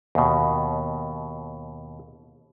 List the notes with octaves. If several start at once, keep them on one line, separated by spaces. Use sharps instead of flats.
D#2 B2